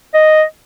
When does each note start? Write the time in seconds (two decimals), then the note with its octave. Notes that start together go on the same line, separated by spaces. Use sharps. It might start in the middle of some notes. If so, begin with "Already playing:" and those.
0.14 D#5